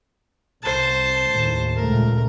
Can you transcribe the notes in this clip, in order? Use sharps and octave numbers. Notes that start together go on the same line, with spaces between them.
C2 C5 A5
D#2 A2
C#2 A#2 A3 A#4